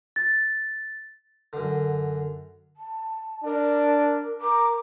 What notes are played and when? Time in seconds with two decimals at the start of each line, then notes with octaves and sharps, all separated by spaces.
0.16 A6
1.53 F#2 D3
2.76 A5
3.44 D4 A#4
4.41 A#4 D6